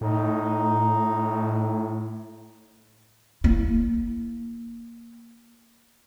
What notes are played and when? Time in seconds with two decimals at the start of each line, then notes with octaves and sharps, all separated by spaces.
0.01 A2 D#4
3.44 A#3 E4